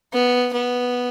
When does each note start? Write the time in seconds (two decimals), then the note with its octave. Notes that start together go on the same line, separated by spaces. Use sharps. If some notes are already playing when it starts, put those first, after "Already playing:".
0.13 B3
0.53 B3